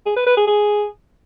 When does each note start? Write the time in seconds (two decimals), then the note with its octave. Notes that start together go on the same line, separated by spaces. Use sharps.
0.06 G#4
0.16 B4
0.27 B4
0.37 G#4
0.47 G#4